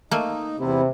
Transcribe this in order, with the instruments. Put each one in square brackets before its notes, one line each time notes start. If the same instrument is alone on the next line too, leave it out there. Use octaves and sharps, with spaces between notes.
[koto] A3 A#3 [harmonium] D#4
[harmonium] E2 E4 [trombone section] C3 [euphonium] C4